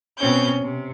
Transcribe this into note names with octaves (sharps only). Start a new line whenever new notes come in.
B2 C4 C#4 G6
C3